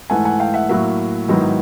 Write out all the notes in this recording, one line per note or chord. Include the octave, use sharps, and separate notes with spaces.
G#2 E3 A3 F#5 G#5
F#5 G#5
F5 G5
E5 F#5
A2 F#3 A#3 E5 F#5
G#2 D#3 F#3 B3 E4